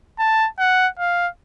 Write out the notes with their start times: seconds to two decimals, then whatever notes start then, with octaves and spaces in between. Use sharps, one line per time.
0.19 A5
0.59 F#5
0.99 F5